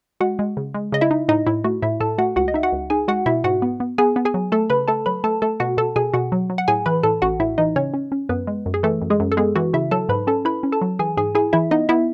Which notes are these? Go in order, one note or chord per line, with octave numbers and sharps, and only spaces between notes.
G#3 F#4 F#5
G#3
C#3
G#3
C#3 D#5
E4 E5
D#4
A2 D#4 D#5
A2 E4
A3 F#4
A2 E4 E5
A2 A4 A5
A3 F#4 F#5
C#2 F#4 F#5
D#5
D#4 E5
F#4 F#5
C#2
D#4 G#4 G#5
G#3 F#4 F#5
B2 E4 E5
G#2 F#4 F#5
B3
B3
B3 G#4 G#5
B3
G#4 G#5
F#3
A3 A4 A5
C#3 B4 B5
A3 A4 A5
F#3 B4 B5
A3 A4 A5
A3 A4 A5
B2 F#4 F#5
B2 A4 A5
B2 G#4 G#5
B2 F#4 F#5
F#3
F#3
F#5
A2 G#4 G#5
E3 B4 B5
A2 A4 A5
A1 F#4 F#5
A2 E4 E5
E3 D#4 D#5
C#3 C#4 C#5
C#4
C#4
F#2 B3 B4
G#3
F#2
G#4
E3 A3 A4
F#2
G#3 G#4
F#2
A4
G#3 B3 G#4
E3 F#4
C#3 E4 E5
F#3 A4 A5
G#2 B4 B5
C#4 A4 A5
E4 B4 B5
C#4
A4 A5
F#3
E3 G#4 G#5
G#2 G#4 G#5
E4 G#4 G#5
E3 E4 E5
B3 D#4 D#5
B3 E4 E5